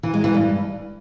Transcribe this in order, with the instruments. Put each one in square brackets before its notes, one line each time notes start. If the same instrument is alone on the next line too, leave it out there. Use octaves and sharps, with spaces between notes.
[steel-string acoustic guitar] E3
G#3
E3
G2